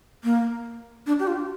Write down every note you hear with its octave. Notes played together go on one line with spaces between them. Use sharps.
A#3
D4
G4
F4